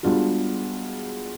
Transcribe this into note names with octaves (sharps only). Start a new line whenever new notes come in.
G3 G#3 B3 D4 F4 F#4